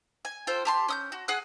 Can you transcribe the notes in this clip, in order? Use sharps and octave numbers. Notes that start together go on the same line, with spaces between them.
G#5
F4 A4 C5 G5
G4 A5 C6
C#4 D#6 G6
F#4
G#4 F#5 G#5 F#6